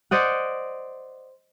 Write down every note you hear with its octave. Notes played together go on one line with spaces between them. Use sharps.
C5 D5 D#5 F#5